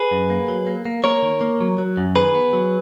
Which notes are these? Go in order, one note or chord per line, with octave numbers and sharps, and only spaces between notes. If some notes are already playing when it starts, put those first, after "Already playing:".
Already playing: G#4 B4
F#2
A#3
F#3
A#3
A#3
A#3 A#4 C#5
D#3
A#3
F#3
F#3
F#2
D#3 G#4 B4
B3
F#3